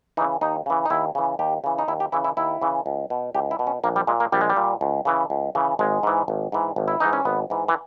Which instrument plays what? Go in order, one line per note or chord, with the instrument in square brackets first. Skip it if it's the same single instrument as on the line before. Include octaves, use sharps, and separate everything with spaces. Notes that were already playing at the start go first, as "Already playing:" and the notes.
[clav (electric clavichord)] C#3 E3 D#4
D#2 D#4
C#3 E3
D#4
D#2 E4
C#3 E3
D#2 G4
C#3 E3
D#4
D#2 E4
G4
C#3 E3 E4
E4
D#2 E4
C#3 E3
C#2
B2
C#2 G4
E4
B2
C#4
A#1 A#3
G3
A#2 G#3
A#3
A#1 G3
G#3
G3
A#2
C#2
C#3 E3
C#2
C#3 E3
G#1 G#3
G#2 E3
G#1
G#2 E3
G#1
E4
G#2 E3 D#4
C#4
G#1 B3
G#2 E3
E3